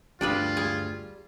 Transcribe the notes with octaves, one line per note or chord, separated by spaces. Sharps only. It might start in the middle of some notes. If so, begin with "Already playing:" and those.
D2 G2 G3 D4 F4 G#4 B4
G#4